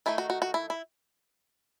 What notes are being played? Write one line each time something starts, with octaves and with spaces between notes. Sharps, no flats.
D#3 A3 D#4 E4
F#4
F#4
F#4
E4
E4